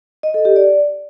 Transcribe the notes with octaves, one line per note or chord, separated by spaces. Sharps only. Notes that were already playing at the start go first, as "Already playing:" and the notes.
D#5
A4
G4
D5